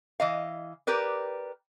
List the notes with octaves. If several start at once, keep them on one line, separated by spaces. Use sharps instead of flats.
E3 D#5 F5
G4 A#4 B4 D5